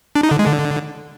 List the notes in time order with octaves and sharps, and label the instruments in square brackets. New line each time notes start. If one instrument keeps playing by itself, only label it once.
[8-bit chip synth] D4
D#4
D3
G#3
D3